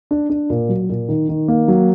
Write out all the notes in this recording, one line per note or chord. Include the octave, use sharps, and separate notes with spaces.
D4
D4
A#2
F#3
A#2
D#3
D#3
A#3
F#3